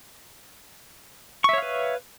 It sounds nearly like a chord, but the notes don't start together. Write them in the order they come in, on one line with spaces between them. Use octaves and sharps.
C#6 E5 C#5 F5 B4